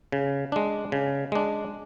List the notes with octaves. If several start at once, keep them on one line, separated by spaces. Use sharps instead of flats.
C#3
G#3 D4
C#3
G#3 D4